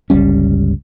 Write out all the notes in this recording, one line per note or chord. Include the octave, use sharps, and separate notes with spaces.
G1 C#2 G3 C#4